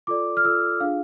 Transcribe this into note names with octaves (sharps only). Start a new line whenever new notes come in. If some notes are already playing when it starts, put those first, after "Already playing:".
F4 A4 D5 D6
F6
F4 A4 D5 E6
D4 F4 G#4 F5